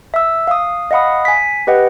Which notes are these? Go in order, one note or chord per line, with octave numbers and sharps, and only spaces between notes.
E5 E6
F5 D#6
D#5 F5 F#5 B5 D#6
G#5 B6
G4 B4 D#5 F#5 G5